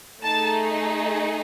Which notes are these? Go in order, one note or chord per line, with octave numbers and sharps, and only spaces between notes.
A3 D#4 G#4 A5